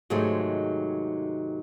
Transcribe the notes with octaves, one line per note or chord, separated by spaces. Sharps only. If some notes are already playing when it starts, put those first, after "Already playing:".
G#2 C3 D#3 F#3 G#3 A3